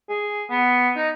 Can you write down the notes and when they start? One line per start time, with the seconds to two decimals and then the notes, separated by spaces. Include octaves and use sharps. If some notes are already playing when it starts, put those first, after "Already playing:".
0.09 G#4
0.50 B3
0.96 D#4